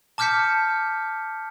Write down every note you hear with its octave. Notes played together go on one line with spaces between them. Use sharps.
A5 D6 F6 G6 B6 C#7